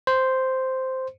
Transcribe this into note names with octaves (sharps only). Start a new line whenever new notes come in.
C5